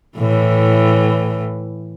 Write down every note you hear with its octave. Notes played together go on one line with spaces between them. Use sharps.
A2 E3